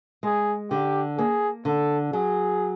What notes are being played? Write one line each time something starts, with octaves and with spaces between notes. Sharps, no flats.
G#3 G#4
D3 G4
A#3 G#4
D3 A4
F#3 G#4